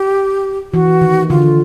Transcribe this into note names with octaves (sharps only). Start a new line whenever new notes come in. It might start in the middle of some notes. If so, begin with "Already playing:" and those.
Already playing: G4
E3 F#4
D#3
D3 F4